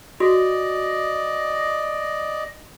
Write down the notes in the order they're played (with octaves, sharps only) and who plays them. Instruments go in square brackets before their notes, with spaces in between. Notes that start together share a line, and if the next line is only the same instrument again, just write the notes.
[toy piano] F#4 [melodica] D5 D#5